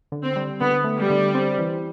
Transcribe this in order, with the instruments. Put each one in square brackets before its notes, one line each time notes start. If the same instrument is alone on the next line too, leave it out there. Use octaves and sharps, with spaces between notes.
[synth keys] D3
[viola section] C4
[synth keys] G3
[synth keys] D3 [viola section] B3
[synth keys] A3
[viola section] G3
[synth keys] D3
C4
E3